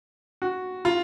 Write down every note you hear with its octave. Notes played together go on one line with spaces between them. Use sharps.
F#4
F4